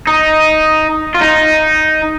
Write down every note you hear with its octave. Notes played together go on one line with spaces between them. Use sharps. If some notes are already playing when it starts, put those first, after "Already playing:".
D#4
F4
D#4